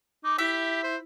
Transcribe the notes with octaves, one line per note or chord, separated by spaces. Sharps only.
D#4 D6
E4 G4 E5
C5